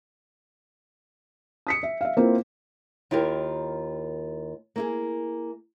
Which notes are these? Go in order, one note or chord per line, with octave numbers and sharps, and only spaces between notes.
D#6 B6 C#7
E5
E5 F5
A#3 C4 E4 F4 A#4 B4
D#2 E4 F4 G4 A#4
A#3 E4 G#4